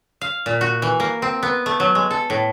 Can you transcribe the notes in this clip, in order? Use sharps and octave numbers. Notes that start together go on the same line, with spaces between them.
F5
A#2
F#4
E3
A#3
C4
B3
A3
F#3
G#3
A4
A2